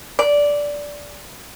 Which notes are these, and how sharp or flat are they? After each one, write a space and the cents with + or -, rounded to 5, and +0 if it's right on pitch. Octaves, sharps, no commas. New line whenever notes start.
D5 -10